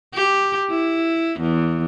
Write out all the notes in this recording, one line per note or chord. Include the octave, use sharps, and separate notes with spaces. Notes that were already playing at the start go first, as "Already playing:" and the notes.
G4
E4
E2